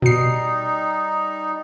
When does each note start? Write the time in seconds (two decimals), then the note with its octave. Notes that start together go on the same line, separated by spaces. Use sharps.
0.02 B2 G3 D#4 C7